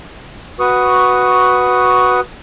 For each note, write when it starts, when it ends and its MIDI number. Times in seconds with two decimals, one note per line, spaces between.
0.60 2.20 66
0.60 2.20 71
0.60 2.20 85
0.60 2.20 87